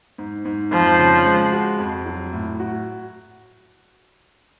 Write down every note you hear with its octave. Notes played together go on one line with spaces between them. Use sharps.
G#2
G#2
F2 F3
C#3
G#3
F#4
F2
F#3
A2
F#4